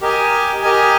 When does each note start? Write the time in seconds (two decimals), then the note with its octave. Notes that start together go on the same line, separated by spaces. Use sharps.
0.01 G4 A#4 D#5 G#5
0.63 G4 A#4 D#5 G#5